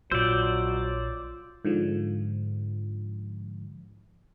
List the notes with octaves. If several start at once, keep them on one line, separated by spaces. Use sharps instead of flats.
A#1 F#3 F4 C5 D5 E6 G6
G#2 D3 F3